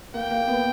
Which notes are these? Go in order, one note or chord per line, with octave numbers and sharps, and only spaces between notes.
A#3 G5
A#3
B3